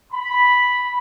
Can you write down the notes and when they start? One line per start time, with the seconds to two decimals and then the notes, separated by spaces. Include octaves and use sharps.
0.12 B5